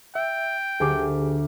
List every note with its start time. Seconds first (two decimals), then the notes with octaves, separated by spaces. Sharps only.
0.15 E5 G5
0.80 D2 G4 G#4 D6